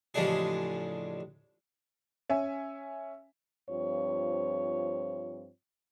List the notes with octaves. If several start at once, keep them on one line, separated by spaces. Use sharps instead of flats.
A1 C#3 F3 G#3 D4 G#4
C#4 E5 G#5
G2 F3 C4 F4 C#5